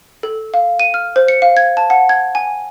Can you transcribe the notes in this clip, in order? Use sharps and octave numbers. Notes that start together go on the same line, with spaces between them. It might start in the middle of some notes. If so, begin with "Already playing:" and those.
A4
F5
D#7
F6
C5
C#7
F5
G#6
A5
F#5
G#6
G#5